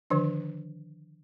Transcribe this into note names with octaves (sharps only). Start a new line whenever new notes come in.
D3 D#3 F3 D4